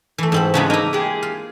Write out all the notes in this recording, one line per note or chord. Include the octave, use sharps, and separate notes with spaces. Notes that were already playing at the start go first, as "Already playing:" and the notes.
E3 A3
G#2 C4 B5
C#3 F#3 G#3 B3 D4 E5
A#3 D#4 E4
G#3 G4 G#4
F4